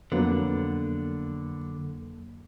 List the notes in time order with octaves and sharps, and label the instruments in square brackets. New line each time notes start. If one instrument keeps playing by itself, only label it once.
[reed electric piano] F2 F#3 A#3 [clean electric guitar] D3 [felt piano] B3